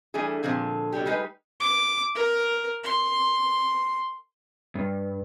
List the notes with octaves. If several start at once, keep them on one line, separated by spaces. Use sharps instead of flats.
E3 G3 A3 D4 G#4
A#2 D3 F3 C4 G#4
B2 F#3 D4 G4
G3 G#3 D#4 B4
D6
A#4
C6
G2